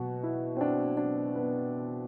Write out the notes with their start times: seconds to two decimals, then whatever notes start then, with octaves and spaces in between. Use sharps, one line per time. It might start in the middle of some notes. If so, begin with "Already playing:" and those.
Already playing: B2 F#3 F#4
0.23 E4
0.57 C4
0.61 D4
0.97 D4
1.35 B3